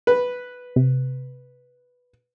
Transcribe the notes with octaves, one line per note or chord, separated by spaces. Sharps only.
B4
C3